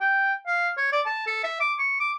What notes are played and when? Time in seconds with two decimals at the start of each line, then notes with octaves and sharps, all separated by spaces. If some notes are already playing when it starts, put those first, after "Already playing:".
0.01 G5
0.47 F5
0.77 C#5
0.93 D5
1.06 A5
1.27 A4
1.44 E5
1.60 D6
1.79 C#6
2.00 D6